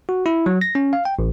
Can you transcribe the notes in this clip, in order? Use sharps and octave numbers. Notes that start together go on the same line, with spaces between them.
F#4
E4
F#3
A#6
C#4
F5
G5
A1